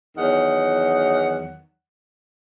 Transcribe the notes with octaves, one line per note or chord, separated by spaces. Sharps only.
E2 D#3 F#3 F#5